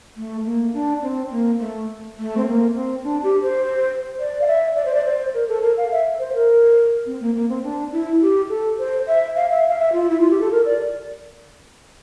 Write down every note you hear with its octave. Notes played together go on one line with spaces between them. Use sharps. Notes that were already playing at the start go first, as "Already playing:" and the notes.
A3
A#3
D4
C4
A#3
A3
A3
C4
A#3
C4
D4
G4
C5
D5
F5
E5
D5
C5
D5
C5
A#4
A4
A#4
F5
E5
C5
A#4
C4
A#3
A#3
C4
D4
E4
G4
A4
C5
E5
F5
E5
F5
E5
F4
E4
F4
G4
A4
A#4
D5